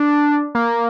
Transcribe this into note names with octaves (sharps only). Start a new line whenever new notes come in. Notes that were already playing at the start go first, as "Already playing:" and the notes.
Already playing: D4
A#3